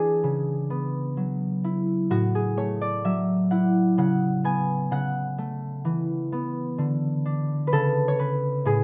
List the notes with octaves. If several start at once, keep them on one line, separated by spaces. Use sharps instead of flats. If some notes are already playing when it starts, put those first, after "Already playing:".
Already playing: E3 D4 G#4
C#3
B3
F#3
E4
A2 F#4
G#4
A3 C#5
D5
F#3 E5
E4 F#5
C#3 F#5
B3 G#5
C#3 F#5
A3
E3
B3
D3
D4
B4
C#3 A4
C#5
C#4 B4
A2 G#4